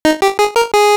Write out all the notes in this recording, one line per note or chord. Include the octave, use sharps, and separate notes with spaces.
D#4
G4
G#4
A#4
G#4